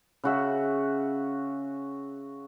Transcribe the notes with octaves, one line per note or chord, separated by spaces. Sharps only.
C#3 F#4 E5